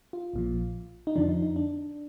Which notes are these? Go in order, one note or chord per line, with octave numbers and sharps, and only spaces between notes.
F4
A#1 A#2 F3
D#4
F2 D3 F3 D4
D#4
D#4
D4